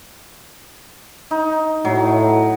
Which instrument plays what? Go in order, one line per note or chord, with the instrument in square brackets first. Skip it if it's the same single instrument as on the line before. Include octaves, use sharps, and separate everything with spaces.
[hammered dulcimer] D#4
[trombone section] A2 [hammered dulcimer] F#3